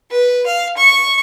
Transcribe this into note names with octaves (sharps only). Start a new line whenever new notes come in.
B4
F5
C#6